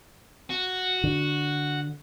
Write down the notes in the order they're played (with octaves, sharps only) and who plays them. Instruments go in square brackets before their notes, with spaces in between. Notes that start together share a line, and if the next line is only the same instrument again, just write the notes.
[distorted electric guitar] F#4
[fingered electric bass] D3